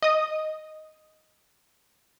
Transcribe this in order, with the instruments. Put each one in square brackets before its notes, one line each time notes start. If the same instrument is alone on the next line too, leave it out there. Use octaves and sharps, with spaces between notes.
[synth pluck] D#5 D#6